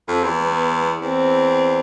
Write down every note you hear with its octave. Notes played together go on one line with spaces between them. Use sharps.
F2
E2
B3
E2 C4